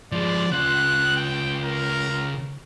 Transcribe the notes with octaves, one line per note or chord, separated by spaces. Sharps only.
F3 G#3 D5
C#3 F4 F#6
G5
A#4